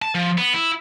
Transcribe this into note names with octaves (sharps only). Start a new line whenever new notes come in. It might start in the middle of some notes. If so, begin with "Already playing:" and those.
A5
F3
B3
E4